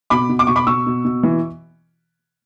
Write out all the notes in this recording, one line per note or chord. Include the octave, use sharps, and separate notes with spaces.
B2 B5 D6
B2
D6
B2 C#6
B5 D6
B2 C#6 E6
B2
B2
E3